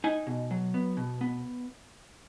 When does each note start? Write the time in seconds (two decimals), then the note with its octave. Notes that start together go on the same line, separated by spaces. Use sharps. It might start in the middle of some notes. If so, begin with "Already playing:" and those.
0.04 D#4 G#5
0.27 B2
0.51 F#3
0.74 B3
0.97 B2
1.21 B3